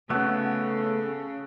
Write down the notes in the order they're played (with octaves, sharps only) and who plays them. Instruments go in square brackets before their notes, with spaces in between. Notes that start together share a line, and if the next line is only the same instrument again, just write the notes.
[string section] C#3 [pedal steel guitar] A3 B3 [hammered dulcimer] F#4 [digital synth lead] A4